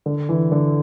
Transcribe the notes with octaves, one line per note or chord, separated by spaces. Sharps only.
D3
E3
D3